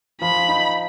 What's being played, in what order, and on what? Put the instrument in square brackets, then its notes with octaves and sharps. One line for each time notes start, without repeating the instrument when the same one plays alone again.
[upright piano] F3 [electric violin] B5
[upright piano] D#4